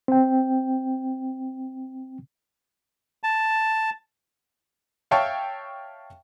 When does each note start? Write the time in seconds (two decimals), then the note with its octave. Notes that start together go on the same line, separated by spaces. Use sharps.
0.08 C4 G5
3.23 A5
5.11 C#5 E5 F5 G5 A5 C#6